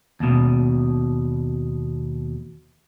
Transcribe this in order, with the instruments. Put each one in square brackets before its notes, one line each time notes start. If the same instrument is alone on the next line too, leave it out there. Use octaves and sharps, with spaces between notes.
[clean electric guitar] D#2 B2